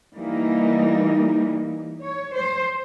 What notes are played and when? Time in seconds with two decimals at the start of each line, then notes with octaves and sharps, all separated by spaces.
0.16 E3 G3 A#3 D#4
2.02 C#5
2.35 C5